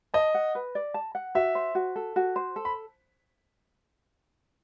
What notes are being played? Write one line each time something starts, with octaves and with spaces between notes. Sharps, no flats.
D#5 A5
F#5
B4
D5
A5
F#5
F#4 E5
C5
F#4
A4
F#4
C5
A4
B5